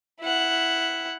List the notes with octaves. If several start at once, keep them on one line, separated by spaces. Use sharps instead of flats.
E4 F#5